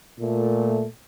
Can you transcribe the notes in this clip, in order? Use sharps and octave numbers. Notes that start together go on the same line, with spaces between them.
A#2 A3